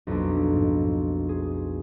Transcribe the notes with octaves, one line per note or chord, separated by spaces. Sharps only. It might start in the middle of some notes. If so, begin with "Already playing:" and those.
B1 F2 A#3 B3 D4
G#2
G#4